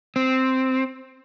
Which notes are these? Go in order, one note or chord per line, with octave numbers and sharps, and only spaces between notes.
C4